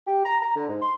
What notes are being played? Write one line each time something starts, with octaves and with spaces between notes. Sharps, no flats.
G4
A#5
A#5
D3
G#2
C6